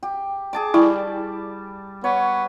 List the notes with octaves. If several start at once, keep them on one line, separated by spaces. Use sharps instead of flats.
G4
G#4 A5 D6
G3 E4
B3 C#5